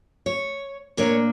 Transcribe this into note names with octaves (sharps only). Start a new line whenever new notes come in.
C#5
A#2 A#3 D4 C#5